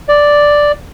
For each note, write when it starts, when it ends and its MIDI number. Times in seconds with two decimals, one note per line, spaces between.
0.08 0.72 74